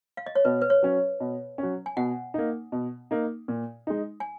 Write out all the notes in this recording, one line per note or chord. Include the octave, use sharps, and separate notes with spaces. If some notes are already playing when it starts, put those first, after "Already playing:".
F5
D#5
C#5
B2 B4
B4
C#5
F#3 C#4
B2
F#3 C#4
G#5
B2 F#5
A#3 D#4
B2
A#3 D#4
A#2
G#3 D#4
G#5